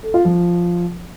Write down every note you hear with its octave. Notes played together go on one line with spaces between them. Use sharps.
A4
F4
F3